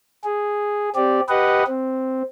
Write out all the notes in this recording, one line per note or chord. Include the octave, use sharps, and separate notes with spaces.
G#4
C4 G4 D5
G4 B4 D#5 F#5
C4